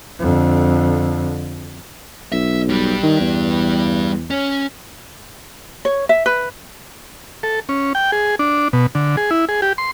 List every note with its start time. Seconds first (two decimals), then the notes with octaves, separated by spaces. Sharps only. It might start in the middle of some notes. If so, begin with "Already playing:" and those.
0.19 F2 D3
2.32 B1 E5
2.69 G2 G3
3.03 D#3
3.21 E2
4.30 C#4
5.85 C#5
6.09 E5
6.26 B4
7.43 A4
7.69 C#4
7.95 G5
8.12 G#4
8.39 D4
8.73 B2
8.95 D3
9.17 G#4
9.31 E4
9.49 G#4
9.62 G4
9.78 C6